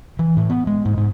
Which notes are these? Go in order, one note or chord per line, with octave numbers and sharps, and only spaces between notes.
E3
A2
B3
G#3
G#2
G#2